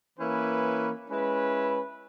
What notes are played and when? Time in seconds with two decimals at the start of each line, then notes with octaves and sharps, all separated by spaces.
0.19 E3 A#3 C#4 E4 B4
1.09 G#3 C#4 E4 B4